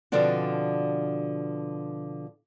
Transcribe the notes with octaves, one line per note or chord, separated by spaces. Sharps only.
B2 D3 F3 C4 D4 F#4